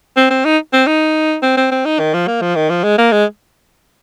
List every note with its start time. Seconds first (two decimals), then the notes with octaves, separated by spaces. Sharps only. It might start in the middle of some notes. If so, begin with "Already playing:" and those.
0.17 C4
0.30 C4
0.45 D#4
0.73 C4
0.87 D#4
1.43 C4
1.57 C4
1.71 C4
1.85 D#4
1.99 D#3
2.14 F3
2.27 A#3
2.41 F3
2.55 D#3
2.70 F3
2.84 G#3
2.98 A#3
3.12 G#3